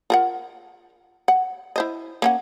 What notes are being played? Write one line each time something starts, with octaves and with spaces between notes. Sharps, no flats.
F4 A#4 F#5
F#5
E4 C5 D#5
A#3 C#4 F#5